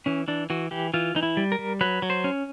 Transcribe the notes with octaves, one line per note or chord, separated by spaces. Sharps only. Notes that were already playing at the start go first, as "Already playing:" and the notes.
E3 C#4
E3 D4
E3 F#4
E3 G4
E3 F4
E3 D#4
E4
G3
A#4
G3
F#3 B4
F#3
C5
C#4